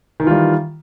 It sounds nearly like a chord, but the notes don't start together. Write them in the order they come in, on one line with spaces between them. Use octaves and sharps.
D#3 E3 F4 G3